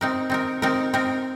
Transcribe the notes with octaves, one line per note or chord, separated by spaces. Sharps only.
C4 D#4 A#4
C4 D#4 A#4
C4 D#4 A#4
C4 D#4 A#4